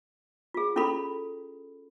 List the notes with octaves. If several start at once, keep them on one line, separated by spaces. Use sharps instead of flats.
F4 G#4
C#4 E4 F4 A4 B5